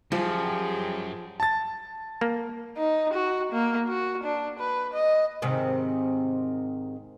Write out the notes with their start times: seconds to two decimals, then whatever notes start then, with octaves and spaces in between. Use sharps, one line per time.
0.12 F#2 F3 G3 G4 G#4
1.40 A5 A6
2.21 A#3
2.77 D#4
3.13 F#4
3.52 A#3
3.89 F#4
4.24 D4
4.59 B4
4.94 D#5
5.42 G#2 C3 D#3